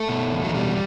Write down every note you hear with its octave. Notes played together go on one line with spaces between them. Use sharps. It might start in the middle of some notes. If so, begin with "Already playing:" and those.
Already playing: A3
B2
E2
F#3
B2 G3